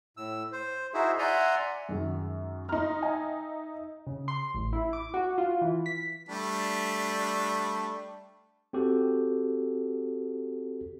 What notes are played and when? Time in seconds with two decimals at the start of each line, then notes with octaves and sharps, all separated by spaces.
0.17 A2 E6
0.52 C5
0.94 D#4 E4 F#4 G#4 C5 E5
1.19 D5 E5 F#5 G#5 A#5 C6
1.89 F#2 D#3 G#3
2.69 D#4 A#5 C6 F6
3.02 E5 G#5
4.07 C#3
4.28 C6
4.54 A1
4.73 E4
4.93 D6
5.14 F#4
5.38 F4
5.61 E3
5.86 B6
6.29 G3 A3 D4
8.73 C4 F#4 G4 A4